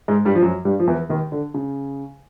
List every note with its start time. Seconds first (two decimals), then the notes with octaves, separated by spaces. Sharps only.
0.08 G#2 G#3
0.25 G2 G3
0.35 F3
0.42 F#2 F#3
0.65 G2 G3
0.80 F3
0.87 E2 E3
1.10 D#2 D#3
1.32 D3
1.54 C#3